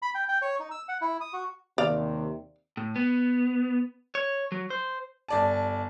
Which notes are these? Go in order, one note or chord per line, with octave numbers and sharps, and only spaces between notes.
B5
G5
G5
C#5
D#4
E6
F#5
E4
D#6
F#4
D#2 C3 D5 F5
A2
B3
C#5
F#3
C5
G1 D5 A5